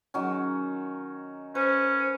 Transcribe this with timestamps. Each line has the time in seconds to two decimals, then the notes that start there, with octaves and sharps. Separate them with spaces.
0.14 D#3 F#3 C#4
1.55 C#4 B4 C5